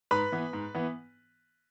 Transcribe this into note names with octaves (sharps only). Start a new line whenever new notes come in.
G#2 B4 B5
E3 B3
G#2
E3 B3